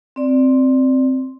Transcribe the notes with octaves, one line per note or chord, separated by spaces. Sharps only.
C4 D5